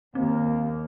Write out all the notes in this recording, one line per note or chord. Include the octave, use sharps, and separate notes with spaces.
D#2 A#3 C4